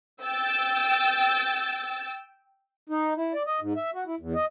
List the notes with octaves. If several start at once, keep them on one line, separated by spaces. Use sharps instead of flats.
G5 E6 A6
D#4
E4
D5
D#5
G#2
E5
F#4
E4
E2
D#5